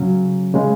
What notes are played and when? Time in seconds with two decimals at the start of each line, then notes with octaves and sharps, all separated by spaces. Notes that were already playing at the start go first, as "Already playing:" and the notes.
Already playing: C#3 F#3 C#4
0.54 C#3 G#3